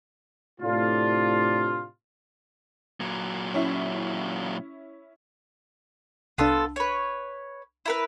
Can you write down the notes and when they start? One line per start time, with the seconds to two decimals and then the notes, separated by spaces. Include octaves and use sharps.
0.61 A2 C3 D4 F4
3.00 A#2 F#3
3.54 C#4 E4
6.38 C2 B3 D4 F4 A4
6.76 B4 C#5
7.86 E4 A#4 B4